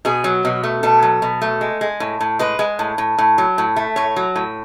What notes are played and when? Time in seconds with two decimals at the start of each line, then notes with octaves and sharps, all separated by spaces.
0.05 B2 G#4
0.24 F#3
0.45 B2
0.63 A3
0.83 B2 A4
1.02 F#3
1.22 B2
1.42 A3
1.61 G#3
1.81 G#3
2.00 A2
2.21 A2
2.39 G#3 B4
2.59 G#3
2.79 A2
2.98 A2
3.18 A2
3.38 F#3
3.58 A2
3.76 A3
3.96 A2 C#5
4.16 F#3
4.36 A2